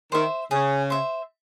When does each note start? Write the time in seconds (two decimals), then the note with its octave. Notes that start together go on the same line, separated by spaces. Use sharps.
0.12 D#3 C5 E5
0.51 C#3 G#4
0.90 C5 E5